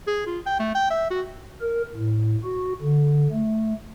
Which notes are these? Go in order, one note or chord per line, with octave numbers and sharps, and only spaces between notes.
G#4
F4
G5
A3
G5
E5
F#4
A#4
A2
F#4
D3
A3